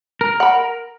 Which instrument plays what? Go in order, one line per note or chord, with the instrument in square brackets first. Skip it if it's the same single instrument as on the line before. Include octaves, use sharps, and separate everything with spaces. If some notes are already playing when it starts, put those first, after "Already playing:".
[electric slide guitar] A#4
[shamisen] F#5 B5